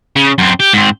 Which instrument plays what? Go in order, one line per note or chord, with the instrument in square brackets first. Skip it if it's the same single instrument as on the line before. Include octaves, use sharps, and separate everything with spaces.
[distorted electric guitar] C#3
F#2 C4
G4
G#2 C4